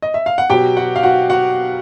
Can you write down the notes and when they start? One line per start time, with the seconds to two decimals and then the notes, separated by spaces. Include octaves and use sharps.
0.02 D#5
0.14 E5
0.26 F5
0.38 F#5
0.50 B2 F#3 G4 G5
0.77 F#4 F#5
0.96 F5
1.03 F#4 F#5
1.30 F#4 F#5